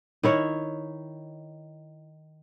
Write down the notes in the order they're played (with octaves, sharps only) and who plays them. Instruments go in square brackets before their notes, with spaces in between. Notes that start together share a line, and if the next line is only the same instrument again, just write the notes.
[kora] D#3 E4 C#5